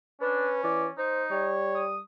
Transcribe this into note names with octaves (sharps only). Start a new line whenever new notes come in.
C#4 D4 B4
E3 D5
D#4 C5
G3 C#5
D#6